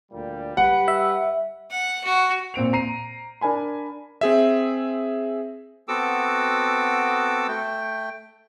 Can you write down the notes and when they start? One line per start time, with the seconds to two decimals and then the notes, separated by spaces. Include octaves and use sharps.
0.11 D2 A#2 G3
0.57 G3 G4 B4 F#5
0.88 E5
1.71 F#5
2.04 F#4
2.54 A#2 C4 D7 F7
2.73 A#5 C7 D#7
3.41 D4 A#4 G#5 B5
4.21 C4 G#4 E5
5.88 B3 C4 F#4 A4 D6 E6
7.48 A3 G5